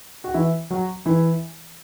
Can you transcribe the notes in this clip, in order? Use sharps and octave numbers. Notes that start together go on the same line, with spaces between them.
F#4
E3 E4
F#3 F#4
E3 E4